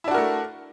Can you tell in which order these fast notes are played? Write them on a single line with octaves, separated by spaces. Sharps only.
E4 D4 F#4 A#4 A3